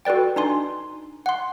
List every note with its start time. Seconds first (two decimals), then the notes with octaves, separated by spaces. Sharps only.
0.05 F#4 A4 B4 D5 G5
0.36 D4 D#4 G#5 C6
1.26 F#5 C6